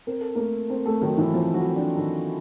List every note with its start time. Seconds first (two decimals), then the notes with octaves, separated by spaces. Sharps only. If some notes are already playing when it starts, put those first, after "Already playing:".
0.07 C4 A#4
0.21 A4
0.35 A3 A#3 A#4
0.70 C4
0.86 A3 A4
1.01 D#3 F#3 D#4
1.18 E3 E4
1.34 F3 C4 F4
1.54 F#3 F#4
1.65 C4
1.76 D4
1.96 D#3 C4 D#4